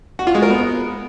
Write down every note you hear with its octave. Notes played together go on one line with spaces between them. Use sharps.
F#4
F4
G#3
A#4
B3